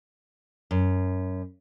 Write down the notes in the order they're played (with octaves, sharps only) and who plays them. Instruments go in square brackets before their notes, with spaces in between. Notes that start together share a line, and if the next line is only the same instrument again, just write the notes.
[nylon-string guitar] F#2